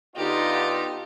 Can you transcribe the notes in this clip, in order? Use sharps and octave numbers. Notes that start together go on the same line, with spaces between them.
D3 B3 D#4 F4 G4